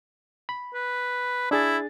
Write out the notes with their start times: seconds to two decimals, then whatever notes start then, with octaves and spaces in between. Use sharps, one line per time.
0.49 B5
0.74 B4
1.51 D4 E4 G#4 A6